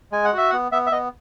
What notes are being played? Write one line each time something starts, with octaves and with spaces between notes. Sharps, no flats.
G#3 G#5
F#5
F#4 E5
F#5
B3
B3 E5
E5
B3 D#5